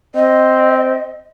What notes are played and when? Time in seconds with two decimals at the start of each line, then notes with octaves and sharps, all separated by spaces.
0.15 C4 D#5